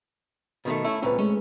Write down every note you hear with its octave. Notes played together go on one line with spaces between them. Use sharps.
B2 D#3 A3
A3 C#4 E4 E5
C#2 A#2 C4 C#4 B4
G#3 A3 C#4